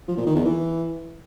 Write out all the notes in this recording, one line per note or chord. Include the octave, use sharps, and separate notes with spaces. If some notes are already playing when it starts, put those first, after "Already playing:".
F3
A#2
D#3
E2
E3